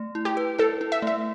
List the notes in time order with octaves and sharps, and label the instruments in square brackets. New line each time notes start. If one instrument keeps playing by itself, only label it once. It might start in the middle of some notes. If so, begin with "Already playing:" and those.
Already playing: [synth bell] A3
E4
[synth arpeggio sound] G4
[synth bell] B4
[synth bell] E4 [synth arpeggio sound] A4
[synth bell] E4
[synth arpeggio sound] E5
[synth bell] A3 [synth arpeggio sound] E5